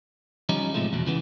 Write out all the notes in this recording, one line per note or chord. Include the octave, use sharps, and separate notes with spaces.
F3 G3 C#4 D#4
A2 C3 F3 G#3 A3
E2 B2
C#3 E3 B3